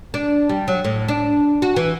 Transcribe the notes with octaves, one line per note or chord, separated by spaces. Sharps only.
D4
G3
F#3
A2
D4
F#4
E3